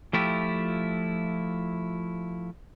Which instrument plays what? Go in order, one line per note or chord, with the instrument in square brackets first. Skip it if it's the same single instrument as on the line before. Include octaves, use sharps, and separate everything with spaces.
[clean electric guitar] F3 A3 E4 F4 G4